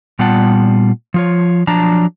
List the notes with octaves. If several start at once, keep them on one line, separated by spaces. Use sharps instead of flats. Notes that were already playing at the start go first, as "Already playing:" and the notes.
A#2 G3 B3 F4 F#5 A5
F3 F4 C#5
F3 F#3 D4 A5 A#5